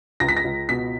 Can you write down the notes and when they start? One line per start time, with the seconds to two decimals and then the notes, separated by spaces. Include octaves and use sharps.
0.20 C#2 A#6
0.29 B6
0.37 A#6
0.44 C#2
0.69 B2 B6